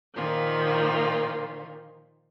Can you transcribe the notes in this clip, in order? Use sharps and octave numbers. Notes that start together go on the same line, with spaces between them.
A#2 D#3 F3 A#3 F4